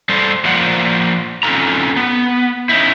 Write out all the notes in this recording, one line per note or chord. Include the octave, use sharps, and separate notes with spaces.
G3 A4 C5
F3 A#3 C5 D5 F#5
C4 C#4 D#4 F4 A4 A#5
B3
C#4 D#4 E4